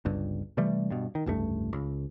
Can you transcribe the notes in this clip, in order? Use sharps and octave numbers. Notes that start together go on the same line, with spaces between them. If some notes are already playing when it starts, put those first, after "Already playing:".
G1 C#2 G2
C3 E3 G3 A3
G2 B2
D#3
F1 C#2 G2 A3
C#2